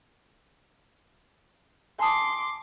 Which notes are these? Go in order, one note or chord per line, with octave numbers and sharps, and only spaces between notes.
G#5 A5 C6 D6 D#6